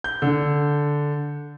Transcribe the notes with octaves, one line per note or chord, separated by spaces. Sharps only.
G6
D3